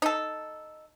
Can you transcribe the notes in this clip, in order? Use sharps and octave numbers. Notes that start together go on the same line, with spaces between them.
D#4 A4